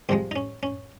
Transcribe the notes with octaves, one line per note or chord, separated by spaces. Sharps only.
C2 C3 F3 G#3 C4
D#4
C#4
C#4